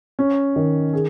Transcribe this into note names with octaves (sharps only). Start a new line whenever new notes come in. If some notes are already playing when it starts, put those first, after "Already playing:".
C#4
D#3
G#4